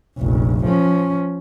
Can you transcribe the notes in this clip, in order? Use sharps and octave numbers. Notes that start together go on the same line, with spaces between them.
F1 A#1
F3 C#4